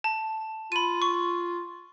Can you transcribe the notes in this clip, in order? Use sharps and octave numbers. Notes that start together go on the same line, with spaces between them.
A5
F4 B5 D#7
C#6